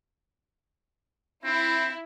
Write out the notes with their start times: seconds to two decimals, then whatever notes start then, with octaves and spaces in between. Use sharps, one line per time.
1.45 C4 E4